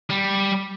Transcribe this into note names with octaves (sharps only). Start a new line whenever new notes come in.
G3